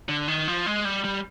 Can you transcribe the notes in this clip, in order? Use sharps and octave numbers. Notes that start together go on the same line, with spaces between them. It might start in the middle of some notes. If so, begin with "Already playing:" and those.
D3
D#3
F3
G#3
G3
G3